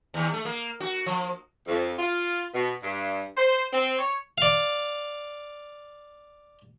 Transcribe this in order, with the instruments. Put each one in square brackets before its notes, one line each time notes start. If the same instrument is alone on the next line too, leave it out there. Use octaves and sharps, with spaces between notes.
[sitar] D#2
A3
A#3
F#4
F3
[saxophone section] F2
F4
B2
G2
C5
C4
C#5
[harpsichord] D5 F5